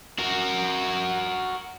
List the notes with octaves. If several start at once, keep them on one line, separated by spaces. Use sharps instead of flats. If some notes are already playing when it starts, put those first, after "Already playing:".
F#4 A#4